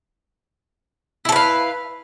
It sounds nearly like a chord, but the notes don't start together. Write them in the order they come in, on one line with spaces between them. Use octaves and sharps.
E4 A4 B4 F5